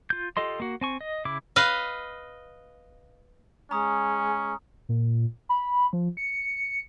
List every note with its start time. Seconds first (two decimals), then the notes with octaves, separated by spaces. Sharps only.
0.10 F4 G6
0.37 F4 G4 A4 D#5 C6
0.60 A#3 F#4
0.81 C4 G#5 C#6
1.01 D#5
1.25 C#3 E4 D6
1.56 B4 D#5 F5
3.71 G#3 C#4 A#5 D#6
4.89 A#2
5.49 B5
5.93 F3
6.17 C#7